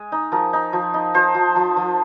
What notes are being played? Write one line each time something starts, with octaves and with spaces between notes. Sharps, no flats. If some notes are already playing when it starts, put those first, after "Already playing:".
Already playing: G#3 G#5
D#4
F3 A#4
D#4
F3
D#4
F3 C5
F3
F3
F3